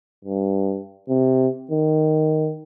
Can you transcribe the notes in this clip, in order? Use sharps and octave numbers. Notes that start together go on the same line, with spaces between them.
G2
C3
D#3